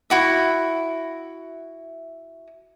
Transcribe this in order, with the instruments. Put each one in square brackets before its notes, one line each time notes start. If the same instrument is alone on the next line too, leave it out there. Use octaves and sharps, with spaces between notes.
[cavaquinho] E4 F#4 E5